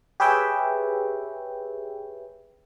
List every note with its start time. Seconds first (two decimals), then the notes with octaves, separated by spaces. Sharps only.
0.20 G4 G#4 B4 C#5 E5 G5